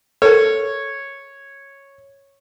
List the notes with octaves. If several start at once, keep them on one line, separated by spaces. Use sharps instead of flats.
A4 A#4 C#5